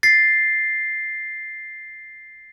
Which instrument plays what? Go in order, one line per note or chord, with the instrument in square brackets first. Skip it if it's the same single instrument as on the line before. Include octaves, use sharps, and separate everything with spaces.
[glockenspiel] A6 C7